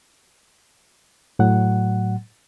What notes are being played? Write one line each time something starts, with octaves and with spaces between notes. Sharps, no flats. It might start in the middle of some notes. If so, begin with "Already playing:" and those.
A2 F#3 F#5